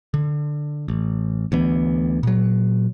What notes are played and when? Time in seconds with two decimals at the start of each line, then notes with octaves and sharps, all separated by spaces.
0.14 D3
0.88 A1
1.52 D2 E3 B3
2.23 A#2 F#3